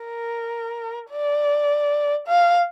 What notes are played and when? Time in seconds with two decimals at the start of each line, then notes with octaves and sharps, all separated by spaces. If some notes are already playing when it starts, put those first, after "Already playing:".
Already playing: A#4
1.11 D5
2.28 F5